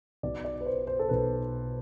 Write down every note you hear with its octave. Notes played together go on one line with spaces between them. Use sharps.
B1 B2 D5
D5
B4
C5
C5
A4
B1 B2 B4